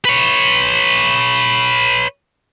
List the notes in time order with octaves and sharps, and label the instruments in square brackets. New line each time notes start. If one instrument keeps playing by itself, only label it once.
[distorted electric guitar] B4 C#5